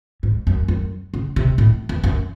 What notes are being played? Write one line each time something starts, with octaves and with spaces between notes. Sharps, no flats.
G#2
F#2
F#2
C#3
C3
A2
E2
F#2